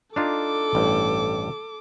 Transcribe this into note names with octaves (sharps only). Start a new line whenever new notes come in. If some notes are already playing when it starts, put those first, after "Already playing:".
D4 D#4 F4 A4 D6
A1 G2